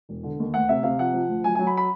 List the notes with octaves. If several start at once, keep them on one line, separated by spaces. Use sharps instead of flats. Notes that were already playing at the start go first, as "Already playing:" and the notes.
E1
D3
D#2
D2 F#5
C3 E5
C3 F5
F3 F#5
F3
D2
F#3 G#5
F#3 G#5
B5
B5